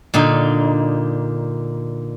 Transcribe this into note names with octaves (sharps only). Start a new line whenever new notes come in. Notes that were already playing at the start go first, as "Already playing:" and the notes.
A#2 D3 D#4